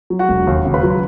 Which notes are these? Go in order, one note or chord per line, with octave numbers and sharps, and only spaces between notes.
F#3
F#4 F#5
E1
D#2
C#3
B4 B5
F#3
B5